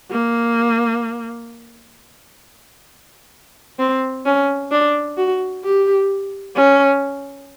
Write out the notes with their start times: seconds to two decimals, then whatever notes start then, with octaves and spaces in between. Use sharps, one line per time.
0.11 A#3
3.79 C4
4.26 C#4
4.72 D4
5.18 F#4
5.64 G4
6.56 C#4